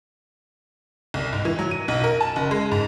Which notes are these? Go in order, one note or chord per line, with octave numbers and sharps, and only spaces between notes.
C2
G#2
E3
F#3
D#7
B1
A#4
A5
F#1
G#3
G#2